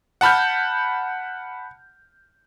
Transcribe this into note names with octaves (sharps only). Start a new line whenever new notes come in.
F#5 A5 B5 F6 G6